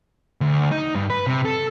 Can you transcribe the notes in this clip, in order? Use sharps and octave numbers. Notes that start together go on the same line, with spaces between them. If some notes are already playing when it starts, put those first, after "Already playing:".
D2
D#4
G2
B4
C3
A4